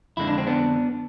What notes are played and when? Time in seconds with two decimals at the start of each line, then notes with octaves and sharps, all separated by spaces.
0.17 F2 D3 G#3 E4
0.27 D4
0.38 C4
0.47 B3 D4